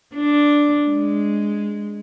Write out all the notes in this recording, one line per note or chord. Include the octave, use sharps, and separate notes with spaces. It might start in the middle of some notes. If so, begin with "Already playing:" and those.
D4
G#3